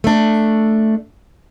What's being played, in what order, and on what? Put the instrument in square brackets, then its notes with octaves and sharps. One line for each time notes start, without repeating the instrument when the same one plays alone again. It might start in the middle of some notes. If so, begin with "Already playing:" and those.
[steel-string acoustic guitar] A3 D4